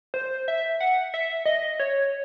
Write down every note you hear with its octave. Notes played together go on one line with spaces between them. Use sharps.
C5
E5
F#5
E5
D#5
C#5